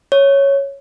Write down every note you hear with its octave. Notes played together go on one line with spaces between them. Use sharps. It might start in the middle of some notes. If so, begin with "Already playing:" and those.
C#5